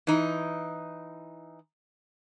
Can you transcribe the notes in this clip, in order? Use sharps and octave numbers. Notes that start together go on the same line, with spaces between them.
E3 D#4